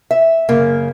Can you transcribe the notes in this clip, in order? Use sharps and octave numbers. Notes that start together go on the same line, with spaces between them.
E5
F#2 C#3 A#3